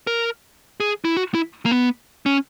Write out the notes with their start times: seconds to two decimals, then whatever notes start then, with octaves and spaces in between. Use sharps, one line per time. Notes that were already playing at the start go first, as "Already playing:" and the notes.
0.07 A#4
0.80 G#4
1.05 E4
1.17 F#4
1.35 E4
1.65 A#3
1.71 B3
2.26 C#4